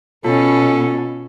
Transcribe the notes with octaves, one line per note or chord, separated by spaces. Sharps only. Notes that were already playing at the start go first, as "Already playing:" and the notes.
B2 C#4 F4 A4 A5